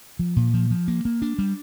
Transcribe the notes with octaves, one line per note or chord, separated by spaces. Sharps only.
F3
A#2
F3
F3
A#3
A#3
D4
G3